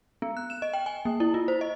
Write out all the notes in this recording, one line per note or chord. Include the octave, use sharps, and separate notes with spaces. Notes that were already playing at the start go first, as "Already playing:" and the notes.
B3
F#6
E7
D#5
G5
G#5
A#3
E4
F4
C5
D#5